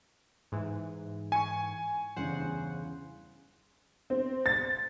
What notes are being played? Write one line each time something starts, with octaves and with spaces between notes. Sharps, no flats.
G#2 E3
G#5 C#6 C#7
E2 G2 C#3 C5 F#5
C4
A6